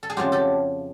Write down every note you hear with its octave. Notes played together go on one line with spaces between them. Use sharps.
A4
G#4
F2 C#3 F#3 A3 F4 G4
G4 A4